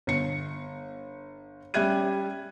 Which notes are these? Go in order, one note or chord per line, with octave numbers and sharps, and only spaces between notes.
G1 C#7
G3 C#4 E5 F#6 G#6 D#7